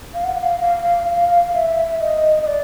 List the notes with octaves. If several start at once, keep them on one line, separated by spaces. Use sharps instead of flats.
F5
F#5
F5
F5
F5
E5
D#5
D#5
D5